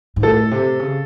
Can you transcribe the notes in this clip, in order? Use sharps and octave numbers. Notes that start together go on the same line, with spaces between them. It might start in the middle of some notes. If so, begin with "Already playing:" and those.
G#2
A2 A4
C3
C#3